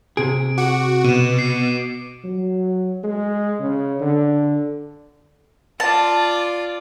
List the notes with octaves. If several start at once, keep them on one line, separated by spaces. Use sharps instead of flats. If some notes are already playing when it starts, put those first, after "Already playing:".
C3 G#4 D7
F#4 D6 C#7
B2 D#7 E7
C7 C#7
F#3
G#3
C#3
D3
F4 D5 A5